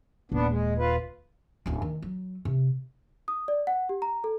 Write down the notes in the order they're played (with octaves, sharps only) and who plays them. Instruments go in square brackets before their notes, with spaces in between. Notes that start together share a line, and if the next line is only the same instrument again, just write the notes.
[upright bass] D#1 [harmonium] B3 D4
[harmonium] G#3
F4 B4
[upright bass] D1 C#4
D#3
F#3
C3
[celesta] D#6
D5
F#5
G4
A#5
A4